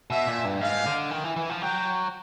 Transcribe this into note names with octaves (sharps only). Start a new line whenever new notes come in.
B2 E5
A#2
G2
G#2 F5
D3
D#3
E3
E3
F3
F#3 G5